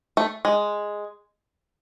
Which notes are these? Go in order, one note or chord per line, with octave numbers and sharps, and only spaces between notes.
A3
G#3